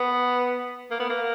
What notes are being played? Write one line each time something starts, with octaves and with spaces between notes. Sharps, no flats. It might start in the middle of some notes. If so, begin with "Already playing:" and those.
Already playing: B3
A#3
B3
A#3